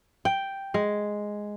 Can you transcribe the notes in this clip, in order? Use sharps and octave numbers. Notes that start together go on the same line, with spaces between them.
G5
G#3